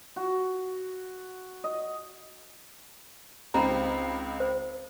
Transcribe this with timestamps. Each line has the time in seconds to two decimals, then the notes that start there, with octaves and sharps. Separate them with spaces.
0.16 F#4
1.64 D#5
3.54 C#2 C4 D#4 A#5 B5
4.40 C5